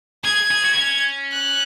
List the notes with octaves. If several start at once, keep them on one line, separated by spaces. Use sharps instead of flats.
G#4 G#6
G#4
F#4
B3
C#4
F#6